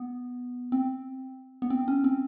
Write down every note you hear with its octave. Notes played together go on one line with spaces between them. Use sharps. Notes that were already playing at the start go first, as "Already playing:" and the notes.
Already playing: B3
C4
B3
C4
C#4
C4